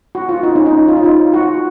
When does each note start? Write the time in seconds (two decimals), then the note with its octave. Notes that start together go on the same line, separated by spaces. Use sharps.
0.15 F#4
0.29 F4
0.43 D#4
0.55 C#4
0.66 D#4
0.88 F4
0.97 D#4
1.04 F4
1.34 F#4